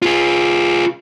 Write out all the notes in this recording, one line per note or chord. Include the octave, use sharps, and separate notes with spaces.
F4 G#4